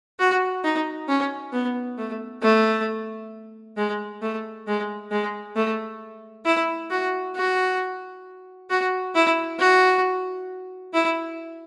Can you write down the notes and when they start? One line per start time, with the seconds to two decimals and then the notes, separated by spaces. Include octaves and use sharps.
0.19 F#4
0.64 D#4
1.08 C#4
1.53 B3
1.98 A3
2.42 A3
3.77 G#3
4.22 A3
4.67 G#3
5.11 G#3
5.56 A3
6.45 E4
6.90 F#4
7.36 F#4
8.70 F#4
9.15 E4
9.59 F#4
10.93 E4